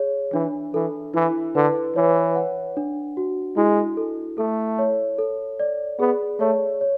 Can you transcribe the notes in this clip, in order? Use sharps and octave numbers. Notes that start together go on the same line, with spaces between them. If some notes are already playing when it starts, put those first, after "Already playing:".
Already playing: G#4 C#5
E3 D4
E3 A4
E3 E4
D3 B4
E3 C#5
F#5
D4
F#4
G#3 E4
A4
A3 A4
C#5
A4
D5
B3 G#4
A3 C#5
C#5